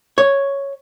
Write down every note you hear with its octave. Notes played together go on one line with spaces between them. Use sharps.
C#5